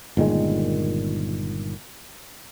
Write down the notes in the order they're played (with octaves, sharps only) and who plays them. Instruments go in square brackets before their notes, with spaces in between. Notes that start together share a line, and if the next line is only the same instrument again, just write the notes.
[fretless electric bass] G1 A#2 D#3 G#3